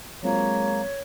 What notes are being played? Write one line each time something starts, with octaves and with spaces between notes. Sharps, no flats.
F#3 G#3 A#3 C4 F4 C#5